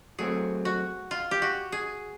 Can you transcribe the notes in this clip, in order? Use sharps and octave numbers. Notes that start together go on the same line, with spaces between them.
F#3 A3 C4 G#4
F#4
F4
G4
F#4
G#4